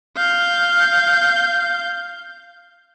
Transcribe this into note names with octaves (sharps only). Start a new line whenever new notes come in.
F5 G6